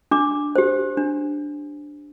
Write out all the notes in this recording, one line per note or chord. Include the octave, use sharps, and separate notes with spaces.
D4 D6
G4 C5
D4